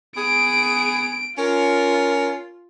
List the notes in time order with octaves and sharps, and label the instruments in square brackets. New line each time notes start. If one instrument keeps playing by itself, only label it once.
[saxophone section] B3 G#4 [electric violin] D7
[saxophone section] C#4 A#4 [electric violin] F4